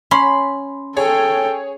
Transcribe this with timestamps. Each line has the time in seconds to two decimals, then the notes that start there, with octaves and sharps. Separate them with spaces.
0.11 C#4 B5 C6
0.97 G#4 A4 C#5 G5